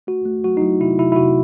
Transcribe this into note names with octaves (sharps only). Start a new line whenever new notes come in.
A3 F#4
A3
F#3 F#4
D#4
F#3 E4
C3 E4
C3 E4
E4
C3 F#4